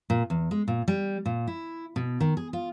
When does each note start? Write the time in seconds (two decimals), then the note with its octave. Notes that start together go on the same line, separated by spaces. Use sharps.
0.10 A#2
0.30 E2
0.51 G#3
0.68 A#2
0.88 G3
1.26 A#2
1.47 E4
1.96 B2
2.20 D#3
2.37 G#4
2.53 F4